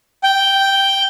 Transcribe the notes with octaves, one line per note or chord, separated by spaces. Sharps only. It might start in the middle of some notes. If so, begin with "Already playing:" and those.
G5